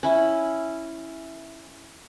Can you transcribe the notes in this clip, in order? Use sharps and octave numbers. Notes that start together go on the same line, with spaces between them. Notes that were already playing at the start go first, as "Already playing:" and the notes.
C#4 E4